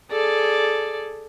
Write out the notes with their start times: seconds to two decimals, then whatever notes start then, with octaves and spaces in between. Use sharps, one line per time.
0.11 G#4 A4 D5